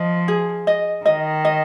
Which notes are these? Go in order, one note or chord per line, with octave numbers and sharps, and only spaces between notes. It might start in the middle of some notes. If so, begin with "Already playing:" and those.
Already playing: F3 D#5
G#4
D#5
D#3 D#5
D#5